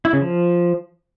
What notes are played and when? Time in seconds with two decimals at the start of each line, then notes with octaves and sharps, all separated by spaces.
0.05 E4
0.13 C#3
0.21 F3